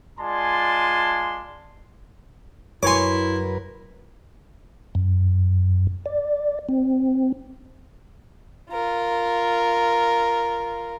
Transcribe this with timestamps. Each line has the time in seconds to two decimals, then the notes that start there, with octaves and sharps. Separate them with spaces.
0.19 G#3 F4 D5 G#5 A5 C6
2.83 F#2 E4 A#4 B4 C#5 G#5 C6 D6
4.95 F#2
6.06 D5
6.69 C4
8.71 F4 A#4